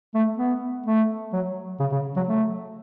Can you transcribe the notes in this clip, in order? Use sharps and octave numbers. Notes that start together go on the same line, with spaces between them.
A3
B3
A3
F#3
C#3
C#3
F#3
A3